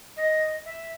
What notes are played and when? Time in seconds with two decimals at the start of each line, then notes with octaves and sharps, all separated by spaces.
0.17 D#5
0.65 E5